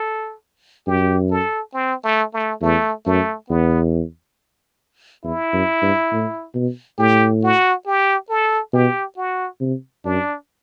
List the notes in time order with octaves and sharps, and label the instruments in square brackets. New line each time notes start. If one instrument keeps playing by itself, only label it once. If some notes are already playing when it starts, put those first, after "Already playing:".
Already playing: [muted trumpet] A4
[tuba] F#2 [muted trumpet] G4
[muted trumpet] A4
C4
A3
A3
[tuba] E2 [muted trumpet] A3
[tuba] F#2 [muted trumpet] A3
[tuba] E2 [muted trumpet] B3
[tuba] E2 [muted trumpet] E4
[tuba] F#2
G2
A2
B2
[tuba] A2 [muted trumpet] G4
[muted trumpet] F#4
G4
A4
[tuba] B2 [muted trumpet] G4
[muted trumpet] F#4
[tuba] C3
[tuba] F#2 [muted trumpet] D4